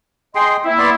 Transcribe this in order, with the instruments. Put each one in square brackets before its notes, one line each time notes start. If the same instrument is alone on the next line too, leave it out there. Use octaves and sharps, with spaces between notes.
[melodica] G#4 G5 [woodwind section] D#5 C6
[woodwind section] A#3 E4 [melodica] C4
[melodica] B3 D5 C6